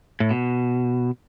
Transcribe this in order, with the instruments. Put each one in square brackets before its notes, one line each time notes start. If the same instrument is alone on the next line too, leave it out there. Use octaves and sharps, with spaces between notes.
[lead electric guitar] A2
B2